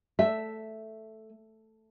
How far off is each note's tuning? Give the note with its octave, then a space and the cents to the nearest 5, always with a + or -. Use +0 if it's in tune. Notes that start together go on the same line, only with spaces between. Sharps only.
A3 +0 E5 +0